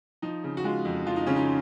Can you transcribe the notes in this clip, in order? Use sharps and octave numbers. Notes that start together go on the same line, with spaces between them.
F3 D#4
C#3
F#4
G#3 F4
F2
F3 F4
D#4
C#3 C#4
D#4